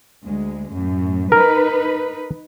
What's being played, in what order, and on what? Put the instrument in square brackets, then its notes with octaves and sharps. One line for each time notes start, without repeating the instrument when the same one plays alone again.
[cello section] D2 G#3
F#2 A2
[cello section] D#4 B4 [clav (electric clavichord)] A#4